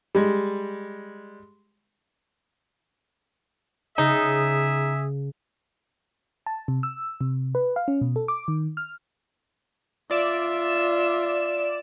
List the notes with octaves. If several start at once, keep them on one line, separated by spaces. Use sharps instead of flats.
G3 G#3
C#3 D#4 G#4 E5
A5
C3
E6
C3
B4
F5
C#4
B2
A4
D6
D#3
F6
F4 D5 E5 E7